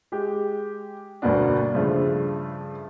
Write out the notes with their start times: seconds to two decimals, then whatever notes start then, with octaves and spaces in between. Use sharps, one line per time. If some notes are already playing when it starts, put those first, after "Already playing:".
0.12 G#3 G4
1.22 D2 G2 B2 A#3 B3 D4
1.74 G2 C#3 F3 A3